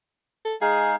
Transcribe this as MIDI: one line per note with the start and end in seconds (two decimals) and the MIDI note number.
0.45 0.55 69
0.61 0.96 56
0.61 0.96 63
0.61 0.93 68
0.61 0.96 77